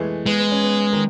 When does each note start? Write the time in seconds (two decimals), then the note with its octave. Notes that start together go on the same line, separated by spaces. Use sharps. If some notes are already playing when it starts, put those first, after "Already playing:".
Already playing: E3 G#3 A3 B3
0.26 G#3 B3
0.39 B3
0.51 C#4
0.63 B3
0.93 D#3